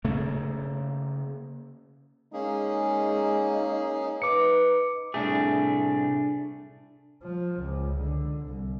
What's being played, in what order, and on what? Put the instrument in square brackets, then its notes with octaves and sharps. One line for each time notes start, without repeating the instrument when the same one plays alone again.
[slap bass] C#3 A3 A#3
[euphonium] G#3 [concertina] A#3 C#4 G#4 [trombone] D#4
[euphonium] B4 [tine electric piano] D6 C#7
[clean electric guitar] C2 A2 A3 [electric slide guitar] D4 G#4
[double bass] F3
C#2
D3
C2